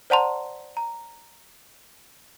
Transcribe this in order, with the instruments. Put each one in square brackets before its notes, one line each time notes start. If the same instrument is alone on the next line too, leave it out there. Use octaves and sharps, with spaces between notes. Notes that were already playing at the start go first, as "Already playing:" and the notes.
[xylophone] C5 D5 F#5 A5 A#5 C6
A#5